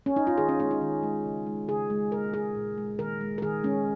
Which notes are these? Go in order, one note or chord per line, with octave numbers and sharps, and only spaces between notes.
C#4
D#4
F4
D#3 G#4
C#4
G#3 C#4
D#4
D#3
G#3
C#3
G#3
C#3 G#4
G#3
A#2 A#4
G#3 G#4
A#2
G#3
D#3 A#4
G#3
A#4
D#3 G#4
G#3 C#4